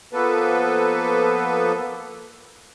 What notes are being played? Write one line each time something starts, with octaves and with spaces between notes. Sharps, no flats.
F3 A#3 B3 A4 B4